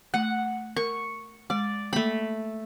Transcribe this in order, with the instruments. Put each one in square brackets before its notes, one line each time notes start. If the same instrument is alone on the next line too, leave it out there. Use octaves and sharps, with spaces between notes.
[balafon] A3 [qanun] F#5
[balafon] A#4 [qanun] C#6
[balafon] G#3 [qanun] D5
[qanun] A3 B5 [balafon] A#3